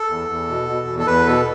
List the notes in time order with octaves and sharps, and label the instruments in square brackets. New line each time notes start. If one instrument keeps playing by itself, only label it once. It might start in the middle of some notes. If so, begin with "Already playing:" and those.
Already playing: [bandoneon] A4
E2
E2
B2
B2
E2
A4
E2 B4
B2 A4